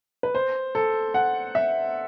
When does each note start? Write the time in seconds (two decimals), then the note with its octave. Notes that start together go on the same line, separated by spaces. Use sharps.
0.23 B4
0.35 C5
0.75 A4
1.14 F#5
1.55 E5